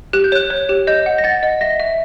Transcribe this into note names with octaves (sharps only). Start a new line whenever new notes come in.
G4 F#6
G6
C#5 F#6
C#5
G4
D#5 G6
F#5
A#6
F#5 A6
D#5
E5 A#6
E5